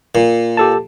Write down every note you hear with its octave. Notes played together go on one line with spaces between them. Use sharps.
A#2
G4 A4 A5